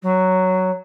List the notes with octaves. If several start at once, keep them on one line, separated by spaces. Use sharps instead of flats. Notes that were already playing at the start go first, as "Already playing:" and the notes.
F#3